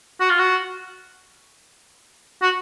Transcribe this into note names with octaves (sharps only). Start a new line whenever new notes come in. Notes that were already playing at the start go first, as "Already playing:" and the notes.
F#4
F4
F#4
F#4